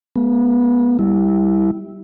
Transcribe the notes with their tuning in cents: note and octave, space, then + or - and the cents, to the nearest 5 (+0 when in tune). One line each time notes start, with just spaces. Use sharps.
G#3 +30 B3 -25
G3 +0 E4 -15